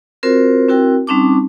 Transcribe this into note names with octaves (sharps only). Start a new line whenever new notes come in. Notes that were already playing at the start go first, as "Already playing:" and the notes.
C4 F4 F#4 A#4 C5
C4 E4 F#4 A#4 G5
G3 C4 C#4 D#4 A5 D6